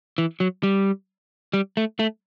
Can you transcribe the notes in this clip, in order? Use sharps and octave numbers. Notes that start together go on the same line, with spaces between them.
E3
F#3
G3
G3
A3
A3